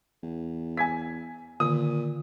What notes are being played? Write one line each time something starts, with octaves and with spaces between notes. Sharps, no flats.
E2
G#5 G#6 B6
A#2 D3 D#3 D#6